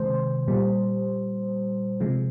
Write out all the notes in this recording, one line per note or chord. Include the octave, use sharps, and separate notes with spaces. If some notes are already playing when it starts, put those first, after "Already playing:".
Already playing: C3 D#3 G#3 C5
A#2 G3
C3 F3 G#3